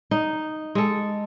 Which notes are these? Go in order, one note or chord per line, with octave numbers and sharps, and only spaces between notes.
D#4
G#3 A4